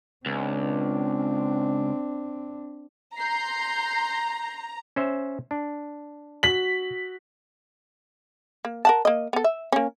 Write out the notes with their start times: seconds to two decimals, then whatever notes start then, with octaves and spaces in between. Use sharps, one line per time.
0.26 C#2 C4 D4
3.16 A#5 C6 G6 C7
4.96 C#4 C5 E5
5.51 D4
6.43 F#4 B6 F#7
8.65 A#3
8.85 A#4 F#5 A5
9.05 A#3 D#5
9.33 B3 A4
9.44 E5
9.72 A#3 C#4